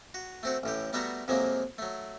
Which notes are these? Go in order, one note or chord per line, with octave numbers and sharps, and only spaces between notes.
F#4
A3 C4 F#4
A1 A2 G4
G3 A3 B3 F#4 E5 A#5
F2 C3 F3 F#3 G#3 A#3
F#3 A3